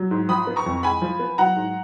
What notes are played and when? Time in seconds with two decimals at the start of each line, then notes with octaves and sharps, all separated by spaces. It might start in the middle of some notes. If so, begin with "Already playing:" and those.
Already playing: F#3
0.11 G#2
0.29 F3 B5 D#6
0.47 B3
0.56 A#5 C#6
0.66 F2
0.83 G#3 G#5 B5
1.02 F3
1.19 B3
1.38 F#3 F#5 A#5
1.56 G#2